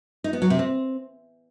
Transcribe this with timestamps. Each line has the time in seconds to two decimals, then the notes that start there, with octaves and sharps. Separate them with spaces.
0.24 D#4
0.33 B3
0.42 F#3
0.50 C3
0.59 C4